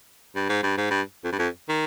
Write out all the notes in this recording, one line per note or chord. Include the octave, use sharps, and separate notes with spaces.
G2
G#2
G2
G#2
G2
F2
G2
F2
D#3